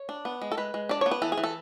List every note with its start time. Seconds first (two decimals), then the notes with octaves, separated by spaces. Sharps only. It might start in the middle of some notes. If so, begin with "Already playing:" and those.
Already playing: C#5
0.09 D4
0.25 B3
0.42 G#3
0.52 A4
0.57 G#3 B4
0.74 G#3
0.89 D4 D5
1.01 B3 C#5
1.11 B4
1.22 E3 A4
1.32 G#4
1.38 E3
1.44 A4